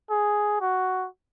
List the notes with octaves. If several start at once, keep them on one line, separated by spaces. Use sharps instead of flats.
G#4
F#4